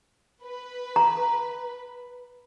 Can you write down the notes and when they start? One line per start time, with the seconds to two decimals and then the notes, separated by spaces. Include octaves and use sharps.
0.44 B4
0.96 A#5